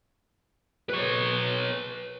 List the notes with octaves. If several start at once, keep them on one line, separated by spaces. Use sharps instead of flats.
B4 C#5